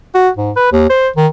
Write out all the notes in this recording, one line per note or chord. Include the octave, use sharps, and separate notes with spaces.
F#4
G#2
B4
D#2
C5
D#3